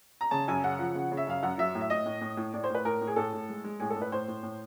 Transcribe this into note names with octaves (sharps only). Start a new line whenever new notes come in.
A#5
C#3 A5
F#2 G#5
C#3 F#5
F3
C#3
C#3
E5
F#2 F5
F#2 F#5
F#3 E5
A2
E5
A2 D#5
A2
A2
A2
A2 D5
C5
A2 B4
A2 A#4
A2
G#4
A2 A4
A2
G#3
G#3
A2 G#4
A4
A2
B4
A2 C5
A2
A2